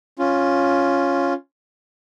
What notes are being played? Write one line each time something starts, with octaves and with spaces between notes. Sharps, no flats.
C#4 F4